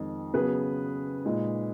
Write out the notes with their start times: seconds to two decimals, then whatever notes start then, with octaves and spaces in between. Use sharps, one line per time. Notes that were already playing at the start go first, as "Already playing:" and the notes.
Already playing: F2 D#3 G#3
0.34 C#3 F#3 B3 G#4 B4
1.25 A#2 G#3 D#4